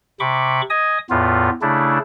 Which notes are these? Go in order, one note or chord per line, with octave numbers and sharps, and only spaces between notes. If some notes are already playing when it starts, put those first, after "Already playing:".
C3 B5 C#6 D6
D#5 G#5 D#6
E2 A2 B3 F4
C#3 A3 D4 E4